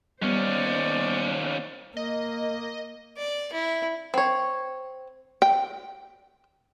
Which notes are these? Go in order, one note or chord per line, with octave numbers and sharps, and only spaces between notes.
D#2 G3 B3 C#4 C5 D5
A#3 D#5
D5
E4
C4 C#5
G5